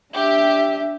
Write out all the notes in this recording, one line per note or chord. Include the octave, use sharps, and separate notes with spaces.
D4 G4 E5